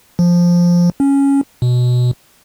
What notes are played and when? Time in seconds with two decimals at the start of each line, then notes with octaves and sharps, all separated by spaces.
0.19 F3
1.00 C#4
1.62 B2